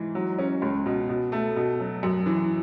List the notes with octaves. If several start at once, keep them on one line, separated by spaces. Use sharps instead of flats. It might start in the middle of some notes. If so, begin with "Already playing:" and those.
Already playing: G#2 E3
F#3
C#4
C#2
B2
B2
A3
B2
F#3
F#2
E3